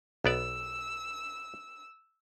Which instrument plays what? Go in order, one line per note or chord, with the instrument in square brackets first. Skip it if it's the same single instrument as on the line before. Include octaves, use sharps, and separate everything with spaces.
[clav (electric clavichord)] B1 B3 D5 [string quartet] E6